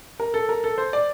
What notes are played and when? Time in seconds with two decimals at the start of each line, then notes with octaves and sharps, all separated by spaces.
0.20 A#4
0.34 A4
0.49 A#4
0.64 A4
0.78 C5
0.93 D5